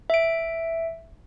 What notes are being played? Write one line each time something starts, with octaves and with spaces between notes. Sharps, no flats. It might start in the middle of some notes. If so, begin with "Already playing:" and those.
E5 D7